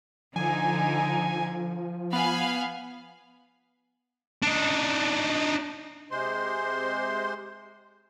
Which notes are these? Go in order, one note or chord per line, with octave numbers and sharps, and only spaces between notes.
D3 F3 D#4 G#5
B3 F5 G#5 B5
D4 D#4
C3 G#3 C5 C6